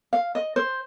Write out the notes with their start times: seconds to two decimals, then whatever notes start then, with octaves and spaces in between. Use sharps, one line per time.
0.13 F5
0.35 D#5
0.56 C5